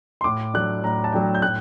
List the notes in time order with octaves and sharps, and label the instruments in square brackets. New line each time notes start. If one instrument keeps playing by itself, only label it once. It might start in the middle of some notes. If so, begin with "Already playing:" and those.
[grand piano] C6
A2 D6
F#3 A3 D4 F#6
A2 A#5
A5
F#3 A3 D4 G5
G6
A2 F#6